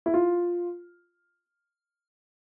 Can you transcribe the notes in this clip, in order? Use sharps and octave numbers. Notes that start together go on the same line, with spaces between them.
E4
F4